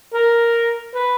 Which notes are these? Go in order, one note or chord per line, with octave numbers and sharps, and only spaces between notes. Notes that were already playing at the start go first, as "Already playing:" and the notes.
A#4
B4